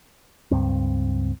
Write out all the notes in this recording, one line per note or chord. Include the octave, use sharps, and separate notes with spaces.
C#2 G2 C4